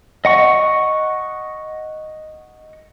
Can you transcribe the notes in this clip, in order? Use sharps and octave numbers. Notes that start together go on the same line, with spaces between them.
D#5 F#5 C#6